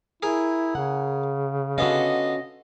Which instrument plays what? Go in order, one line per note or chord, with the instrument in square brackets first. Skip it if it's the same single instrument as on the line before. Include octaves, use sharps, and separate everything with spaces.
[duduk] E4 [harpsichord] G#4 A#4
[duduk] C#3 [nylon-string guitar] F#5
[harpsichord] D3 B3 F4 [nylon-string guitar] C#4 F#4 [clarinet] D#5